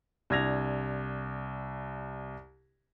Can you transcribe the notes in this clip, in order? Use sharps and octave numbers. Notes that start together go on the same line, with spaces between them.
C2 D4 G#6 A#6 F7